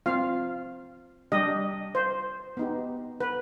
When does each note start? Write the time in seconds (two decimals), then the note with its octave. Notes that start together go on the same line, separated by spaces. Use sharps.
0.06 C4 F4 F5
1.32 G3 D4 G4 D#5
1.95 C5
2.57 B3 D#4 G4
3.20 B4